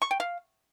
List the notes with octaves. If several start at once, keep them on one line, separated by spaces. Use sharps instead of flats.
C#6
G5
F5